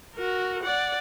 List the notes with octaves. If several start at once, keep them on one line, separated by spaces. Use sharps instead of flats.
F#4 A#4
D5 F#5